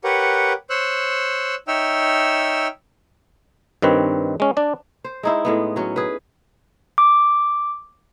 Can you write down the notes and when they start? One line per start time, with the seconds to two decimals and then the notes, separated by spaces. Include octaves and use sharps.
0.04 G4 A#4 B4 C#5 F#5
0.70 C5 C#5 E6 F#6
1.68 D#4 C#5 E5 G5 E6 F6
3.82 G2 D#3 C4 B4 C#5
4.40 G#3 C#4
4.57 D4 D5
5.04 C5
5.23 G#3 D#4 E4
5.45 A2 G#3 B3
5.76 F#3 C#4
5.96 G#4 B4
6.98 D6